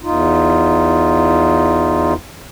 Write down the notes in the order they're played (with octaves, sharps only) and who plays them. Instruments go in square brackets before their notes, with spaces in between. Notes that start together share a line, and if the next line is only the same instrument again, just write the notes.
[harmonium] E2 D#4 F4